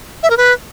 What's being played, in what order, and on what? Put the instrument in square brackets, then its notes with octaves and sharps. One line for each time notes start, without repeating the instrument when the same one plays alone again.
[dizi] E5
A#4
B4